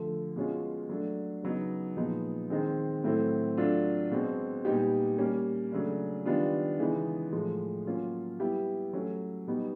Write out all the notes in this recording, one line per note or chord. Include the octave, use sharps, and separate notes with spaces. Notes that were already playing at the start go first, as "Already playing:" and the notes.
Already playing: D3 F3 A3
B2 G#3 C#4 F4
F#3 A3 D4
C#3 F#3 B3 D#4
A#2 F3 G#3 B3 D#4
D#3 G#3 C4
A2 F#3 A3 C4 E4
F#3 A3 D4 F4
B2 G#3 C4
A#2 G3 B3 D#4 G4
G3 A#3 C#4
C#3 F#3 A3 D4
D#3 G3 B3 D4 F4
C#3 E3 G#3 B3 D#4
A2 F3 G#3
F#3 A#3 C#4 F4
G3 B3 E4 G4
F#3 A3 C#4
B2 G3 B3 D#4